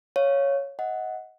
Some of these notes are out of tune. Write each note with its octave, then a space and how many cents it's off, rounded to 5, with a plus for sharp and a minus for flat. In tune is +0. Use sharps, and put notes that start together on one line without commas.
C#5 +0 F5 +0
D#5 +25 F#5 +0